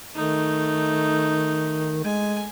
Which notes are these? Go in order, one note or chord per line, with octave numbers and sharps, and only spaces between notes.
D#3 A3 D#4
G#3 G#5